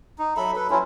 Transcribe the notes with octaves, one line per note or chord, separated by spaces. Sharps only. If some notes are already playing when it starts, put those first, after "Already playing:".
D#4
F#3 A4 E5 B5
A4 B4
F#3 C#4 E4 F4